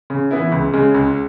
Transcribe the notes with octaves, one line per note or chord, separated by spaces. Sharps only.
C#3
E3 B3 E4
C#2
C#3 G#3
C#2